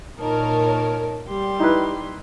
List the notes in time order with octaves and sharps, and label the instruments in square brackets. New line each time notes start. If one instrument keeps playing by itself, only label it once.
[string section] A#2 A#4 C#5 [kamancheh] D#4 A5
[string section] G3 [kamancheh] G4 C6
[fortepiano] D#4 E4 B4